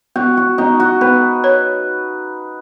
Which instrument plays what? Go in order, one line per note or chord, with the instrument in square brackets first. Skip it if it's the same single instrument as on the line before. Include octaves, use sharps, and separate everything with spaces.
[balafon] B3 [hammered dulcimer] F#4
[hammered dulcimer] F#4
[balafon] B3 [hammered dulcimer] D#4
[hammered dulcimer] F#4
[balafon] B3 [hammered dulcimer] B4
[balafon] C#5